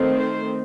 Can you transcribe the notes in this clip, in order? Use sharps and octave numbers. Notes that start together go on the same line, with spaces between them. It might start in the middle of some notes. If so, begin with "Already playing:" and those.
Already playing: D#3 A3 C4
C5